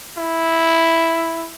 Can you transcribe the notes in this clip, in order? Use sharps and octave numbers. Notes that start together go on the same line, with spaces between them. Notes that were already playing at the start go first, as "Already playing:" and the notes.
E4